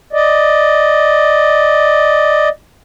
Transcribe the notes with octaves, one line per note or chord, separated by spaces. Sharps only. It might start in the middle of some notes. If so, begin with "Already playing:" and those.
D5 D#5